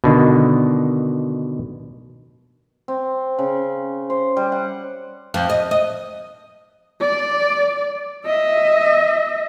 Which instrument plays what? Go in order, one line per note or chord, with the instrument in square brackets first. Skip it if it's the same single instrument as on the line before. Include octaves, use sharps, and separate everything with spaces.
[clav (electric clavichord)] B2 D3 D#3
[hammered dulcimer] C4
C#3
C5
G3
F#5
[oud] F2
D#5
D#5
[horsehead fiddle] D5
D#5 E5